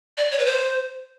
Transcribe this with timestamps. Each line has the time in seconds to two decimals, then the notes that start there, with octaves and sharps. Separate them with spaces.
0.17 D5
0.31 C#5
0.39 B4
0.46 C5